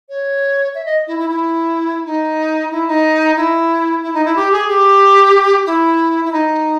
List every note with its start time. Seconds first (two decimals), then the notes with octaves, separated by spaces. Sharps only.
0.09 C#5
0.75 E5
0.86 D#5
1.07 E4
1.19 E4
1.29 E4
2.06 D#4
2.71 E4
2.88 D#4
3.37 E4
4.02 E4
4.14 D#4
4.25 E4
4.36 G4
4.52 G#4
4.68 G4
5.66 E4
6.25 E4
6.32 D#4